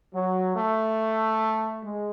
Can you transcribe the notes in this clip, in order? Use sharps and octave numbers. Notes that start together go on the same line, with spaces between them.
F#3
A3
G#3